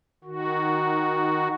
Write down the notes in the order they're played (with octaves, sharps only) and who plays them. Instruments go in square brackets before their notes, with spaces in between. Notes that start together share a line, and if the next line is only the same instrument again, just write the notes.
[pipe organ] D#3 F#4